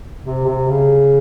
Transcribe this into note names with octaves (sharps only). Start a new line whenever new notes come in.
C3
C3
C#3